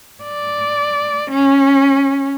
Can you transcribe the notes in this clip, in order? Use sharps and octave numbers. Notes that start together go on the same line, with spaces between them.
D5
C#4